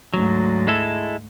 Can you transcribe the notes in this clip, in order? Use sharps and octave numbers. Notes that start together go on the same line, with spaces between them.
D2 G#2 F#3
G#3 E4 A4